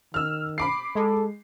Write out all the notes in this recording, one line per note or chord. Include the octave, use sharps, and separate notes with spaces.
D#3 E6 F6
B5 D6 C7
G#3 A4